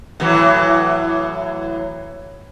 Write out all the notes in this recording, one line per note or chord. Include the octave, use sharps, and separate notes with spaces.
A2 E3 F#3